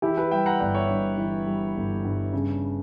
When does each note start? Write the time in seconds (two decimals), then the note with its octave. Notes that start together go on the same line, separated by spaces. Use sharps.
0.02 E3 E4 G4
0.17 G4 B4
0.31 G3 E5 G5
0.46 F#5 A#5
0.60 G1 D5 F#5
0.75 C#5 E5
0.89 G2
1.17 E3
1.47 G3
1.76 G1
2.05 G2
2.33 C#3